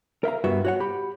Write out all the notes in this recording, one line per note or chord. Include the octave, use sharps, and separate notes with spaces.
A#4 E5 F5 A#5
G2 B3 F#4 E5
F#4 C#5 F#5
G4 B5